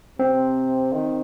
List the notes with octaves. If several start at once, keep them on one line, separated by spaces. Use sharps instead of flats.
C3 C4
D#3